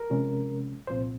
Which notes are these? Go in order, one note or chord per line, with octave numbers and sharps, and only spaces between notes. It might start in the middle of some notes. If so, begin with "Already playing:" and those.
Already playing: A#4
C3 F3 G#3 C#4
C2 A#2 F3 C4 C5